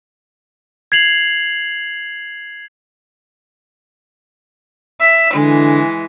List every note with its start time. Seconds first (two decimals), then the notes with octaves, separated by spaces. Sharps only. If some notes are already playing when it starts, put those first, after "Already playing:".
0.92 G#6 C7 F7 F#7
4.99 E5
5.35 D3 E3 G#3